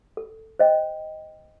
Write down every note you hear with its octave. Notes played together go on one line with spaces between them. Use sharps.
A4
C5 D#5 G5